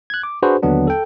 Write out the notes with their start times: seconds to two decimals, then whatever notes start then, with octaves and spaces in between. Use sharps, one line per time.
0.10 F#6 G#6
0.23 D6
0.42 D4 F#4 G#4 B4 C5
0.63 D#2 D3 F#3 B3 D4
0.87 A4 G5